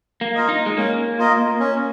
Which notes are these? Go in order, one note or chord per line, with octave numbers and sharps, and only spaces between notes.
A#3
F4 A#4 D#5
D#4
G#3
A#3 C#4
F4 A#4 D#5
C#4